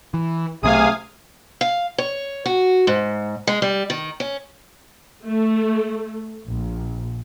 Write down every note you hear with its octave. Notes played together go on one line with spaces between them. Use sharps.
E3
B1 C3 D#3 A3 G#4 F5 G#5 D#6
F5
C#5
F#4
G#2
G#3
G3
D#3
C#4
A3
A#1